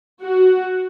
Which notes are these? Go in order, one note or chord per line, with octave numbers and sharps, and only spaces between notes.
F#4